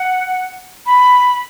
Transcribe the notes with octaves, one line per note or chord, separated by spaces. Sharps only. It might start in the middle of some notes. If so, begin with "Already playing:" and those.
Already playing: F#5
B5